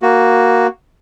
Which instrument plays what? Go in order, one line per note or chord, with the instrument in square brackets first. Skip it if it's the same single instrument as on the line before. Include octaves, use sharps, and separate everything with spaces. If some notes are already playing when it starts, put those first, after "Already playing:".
[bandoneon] A#3 F#4